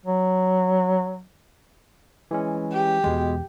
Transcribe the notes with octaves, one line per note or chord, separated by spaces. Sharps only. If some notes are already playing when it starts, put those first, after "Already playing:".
F#3
E3 G#3 C#4
G4
E2 B2 G#3